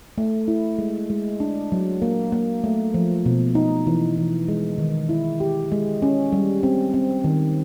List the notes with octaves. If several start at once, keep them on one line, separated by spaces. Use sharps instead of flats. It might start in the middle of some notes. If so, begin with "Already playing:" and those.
A3
E4
G#3
G#3
D4
F#3
A#3
A#3
A3
F3
B2
D#4
E3
E3
G#3
D#3
E4
G4
G#3
C#4
G3
C4
C4
D#3